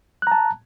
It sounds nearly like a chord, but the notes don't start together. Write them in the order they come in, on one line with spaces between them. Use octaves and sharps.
F#6 A#5 A5